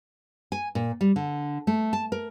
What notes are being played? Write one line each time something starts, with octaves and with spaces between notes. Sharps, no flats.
G#5
A#2
G3
D3
A3
A5
A#4